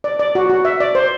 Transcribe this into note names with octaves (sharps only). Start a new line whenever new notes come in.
D5
D5
F#4
F#4
E5
D5
C5